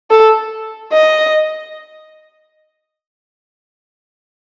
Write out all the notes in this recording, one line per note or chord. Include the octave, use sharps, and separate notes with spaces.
A4
D#5